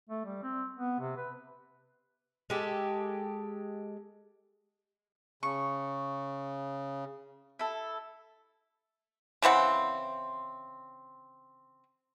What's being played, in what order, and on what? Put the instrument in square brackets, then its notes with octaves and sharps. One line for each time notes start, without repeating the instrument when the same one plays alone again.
[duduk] A3
G3
C4
B3
C3
B4
[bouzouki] G#3 G4 A4
[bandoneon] C#3 [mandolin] C#6
[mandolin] E4 A4
[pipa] C#3 E3 C4 F#5